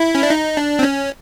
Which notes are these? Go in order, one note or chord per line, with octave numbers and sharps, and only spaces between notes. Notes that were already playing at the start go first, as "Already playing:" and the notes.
Already playing: E4
C#4
D4
D#4
D4
C4
C#4